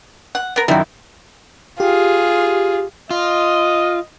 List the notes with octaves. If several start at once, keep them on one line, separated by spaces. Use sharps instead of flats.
F#5
B3 A#4
F#2 D#3 G3 E4 F#4
F4 G4 G#4
F4 D#5